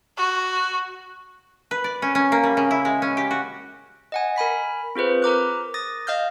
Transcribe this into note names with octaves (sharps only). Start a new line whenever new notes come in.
F#4
B4
D5
C#4
C#4
A#3
G3
C#3
E4
G#3
C#4
G4
F#4
D#5 F#5 G#5
A#4 G#5 B5 B6
C4 F4 G#4 B4 C5
A#4 A#5 D6 F#6
D#6 A6 A#6
D#5 F5 F6 G6